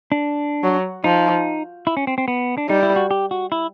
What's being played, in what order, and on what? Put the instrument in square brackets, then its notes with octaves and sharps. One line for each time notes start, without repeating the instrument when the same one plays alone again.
[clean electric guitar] D4
[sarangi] F#3
[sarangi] F3 [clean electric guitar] D#4
[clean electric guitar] E4
C#4
C4
C4
B3
D4
[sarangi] G3 [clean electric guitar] D#4
[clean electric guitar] E4
F#4
G4
F#4
E4